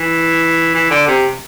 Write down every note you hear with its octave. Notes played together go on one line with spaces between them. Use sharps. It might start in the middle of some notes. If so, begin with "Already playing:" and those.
Already playing: E3
E3
D3
C3